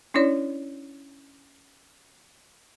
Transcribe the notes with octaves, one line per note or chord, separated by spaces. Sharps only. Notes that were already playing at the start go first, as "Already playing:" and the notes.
C#4 D4 E4 C#5 D5